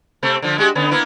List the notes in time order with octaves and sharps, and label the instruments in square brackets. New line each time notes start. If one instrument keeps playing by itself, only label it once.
[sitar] C3 A3 C4
D3 F3
G#3 F#4 G4
D3 B3 C#4
A#3 B3 E4